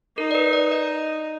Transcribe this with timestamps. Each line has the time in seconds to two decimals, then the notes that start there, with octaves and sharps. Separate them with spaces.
0.17 D#4 A#4
0.31 D5
0.35 B4
0.53 D5
0.72 D#5